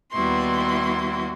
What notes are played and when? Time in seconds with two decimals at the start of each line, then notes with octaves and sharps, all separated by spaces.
0.12 D#2 G3 B3 E4 F#4 C6